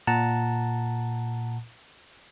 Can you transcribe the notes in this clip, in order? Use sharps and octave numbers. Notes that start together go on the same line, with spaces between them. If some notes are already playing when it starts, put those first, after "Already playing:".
A#2 F#5 A5 A#5